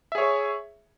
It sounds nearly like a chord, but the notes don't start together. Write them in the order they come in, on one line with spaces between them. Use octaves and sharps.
E5 G#4 C#5